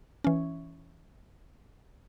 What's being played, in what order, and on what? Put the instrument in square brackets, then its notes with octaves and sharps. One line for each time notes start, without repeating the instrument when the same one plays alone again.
[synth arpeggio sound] E3 C#4